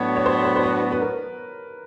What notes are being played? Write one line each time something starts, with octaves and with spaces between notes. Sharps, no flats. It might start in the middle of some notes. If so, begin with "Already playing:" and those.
Already playing: A2 F#3 B3 D4 F#4 C#5
C#5
C5
C5
C5
B4
B4
A#4